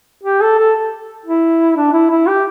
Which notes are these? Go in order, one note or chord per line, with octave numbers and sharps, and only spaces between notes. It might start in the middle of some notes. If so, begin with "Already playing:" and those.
G4
A4
A4
E4
D4
E4
E4
G4